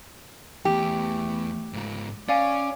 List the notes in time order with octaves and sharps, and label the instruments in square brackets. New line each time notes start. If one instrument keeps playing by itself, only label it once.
[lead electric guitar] E2 [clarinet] A3 [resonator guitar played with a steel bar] G4
[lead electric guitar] G#2 F4
[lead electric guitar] C#4 [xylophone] D5 F5 G#5 [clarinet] D6